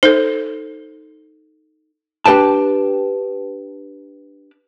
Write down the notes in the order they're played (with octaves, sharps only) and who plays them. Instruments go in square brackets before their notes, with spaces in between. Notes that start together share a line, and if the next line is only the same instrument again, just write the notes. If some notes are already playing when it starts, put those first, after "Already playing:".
[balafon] D#4 A4 [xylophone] C5
[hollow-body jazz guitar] D4 G4 B4 G5 A5